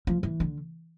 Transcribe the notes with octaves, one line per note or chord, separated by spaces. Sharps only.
F3
E3
D3